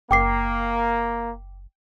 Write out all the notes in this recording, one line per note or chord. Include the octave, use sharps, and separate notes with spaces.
F#1 A#3 G5 D6 C7